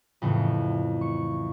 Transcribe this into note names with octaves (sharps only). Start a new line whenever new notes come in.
F2 A2 C#3 E3
C#6